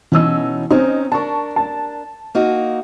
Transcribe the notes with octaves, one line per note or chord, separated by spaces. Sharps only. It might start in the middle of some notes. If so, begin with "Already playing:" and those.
B2 E3 C#4 D#4 E6
C4 C#4 D#4
D4 A#4 A5 C#6
A5
A#3 D#4 F#4